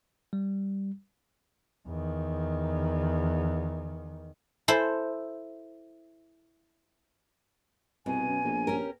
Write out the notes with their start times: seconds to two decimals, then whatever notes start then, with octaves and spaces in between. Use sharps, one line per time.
0.33 G3
1.87 E2 D#3
4.68 E4 A4 C5
8.06 C2 B2 G#5
8.28 F#2
8.44 A#1
8.67 C#4 G4 A#4